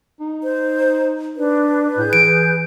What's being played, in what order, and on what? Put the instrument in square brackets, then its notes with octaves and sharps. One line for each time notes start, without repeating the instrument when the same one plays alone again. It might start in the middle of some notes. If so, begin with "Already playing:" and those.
[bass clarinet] D#4
[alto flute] C5
[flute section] D4 [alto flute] B4
[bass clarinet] A2 [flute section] G#4 G6
[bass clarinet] E3 [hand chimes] D7